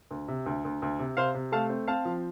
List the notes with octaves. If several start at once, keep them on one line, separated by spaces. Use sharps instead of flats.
D2
C3
D2
D2
D2
C3
C3 C5 F5
C3
A3 F5 A5
C4
C4 F5 A5
F3